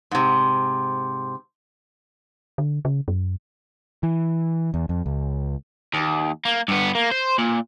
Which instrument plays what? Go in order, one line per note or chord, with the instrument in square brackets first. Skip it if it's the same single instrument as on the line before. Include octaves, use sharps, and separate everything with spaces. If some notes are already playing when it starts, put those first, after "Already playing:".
[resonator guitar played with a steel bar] G#2 C3
[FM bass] D3
C#3
F#2
[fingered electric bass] E3
E2
F2
C#2
[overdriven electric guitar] D#2
A#3
G2 B3
A#3
C5
A#2